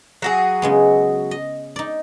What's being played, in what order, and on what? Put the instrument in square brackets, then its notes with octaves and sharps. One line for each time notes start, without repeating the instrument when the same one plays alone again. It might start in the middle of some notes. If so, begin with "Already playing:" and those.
[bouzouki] F#3 F#4 G#4
[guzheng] C#3 G#3 B3
D#5
D#4 D5